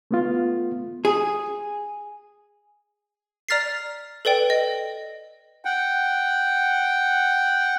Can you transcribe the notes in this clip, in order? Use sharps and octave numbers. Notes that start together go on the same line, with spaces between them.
A3 B3 F4
G#4
D5 A#5 F6 A6 B6 C7
A4 B4 D5 G5
D#5
F#5 G5